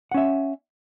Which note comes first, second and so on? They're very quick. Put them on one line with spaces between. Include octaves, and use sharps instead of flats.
F#5 C#4 E5